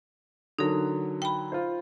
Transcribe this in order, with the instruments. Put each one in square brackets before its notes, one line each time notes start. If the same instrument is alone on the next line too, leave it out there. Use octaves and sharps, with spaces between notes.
[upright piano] D3 F#3 [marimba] D#4 A#4
[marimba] G5 B5
[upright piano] F4 C5